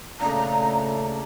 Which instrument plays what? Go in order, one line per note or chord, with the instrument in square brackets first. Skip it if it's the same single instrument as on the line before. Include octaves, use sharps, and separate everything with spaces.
[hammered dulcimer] A#2 D4 [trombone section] C#3 A3 A4 [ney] A#5